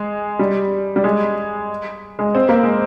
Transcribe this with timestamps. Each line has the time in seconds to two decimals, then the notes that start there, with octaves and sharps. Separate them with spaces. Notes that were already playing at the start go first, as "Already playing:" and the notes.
Already playing: G#3
0.39 G3
0.96 G3
1.04 G#3
2.19 G#3
2.35 C4
2.49 A#3
2.63 G#3